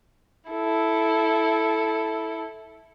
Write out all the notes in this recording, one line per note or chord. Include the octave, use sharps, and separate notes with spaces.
E4 A4